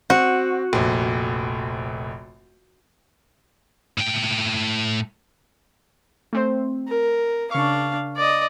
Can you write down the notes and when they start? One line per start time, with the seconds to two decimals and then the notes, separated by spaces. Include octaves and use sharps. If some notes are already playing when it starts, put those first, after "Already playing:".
0.10 C4 F#4
0.73 F1 A#1
3.98 A2 G5
6.33 A3 C4 C5
6.88 A#4
7.51 C#3 D4 F5 C#6
8.16 D5 D#5